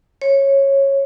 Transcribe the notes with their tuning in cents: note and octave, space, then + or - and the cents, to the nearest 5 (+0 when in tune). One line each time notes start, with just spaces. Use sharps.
C#5 -15